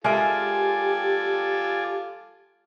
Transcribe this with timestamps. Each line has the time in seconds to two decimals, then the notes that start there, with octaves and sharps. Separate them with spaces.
0.04 G#3 F4 G4 A4 A#4 D5 E5 G#5